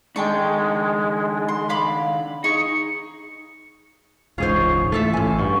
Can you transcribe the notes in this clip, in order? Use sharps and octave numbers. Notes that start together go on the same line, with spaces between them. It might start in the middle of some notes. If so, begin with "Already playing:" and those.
D#3 G#3 D4 G5 A5 C#6
C6
F5 B5 D6
D#4 G#4 C#6 C#7
E1 C#2 G#2 F4 G#4 C5 C#5
E3 A3 F4 A4 E5
A1 F#2 G#5
G2 F4 F#4